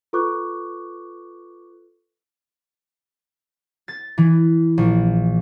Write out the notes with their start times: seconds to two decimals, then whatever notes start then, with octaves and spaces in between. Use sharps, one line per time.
0.13 F4 A4 B4 C#6 D6 F#6
3.88 A6
4.18 E3
4.78 A#1